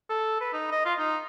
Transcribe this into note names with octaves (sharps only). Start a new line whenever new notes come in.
A4
B4
D#4
D#5
F4
D#4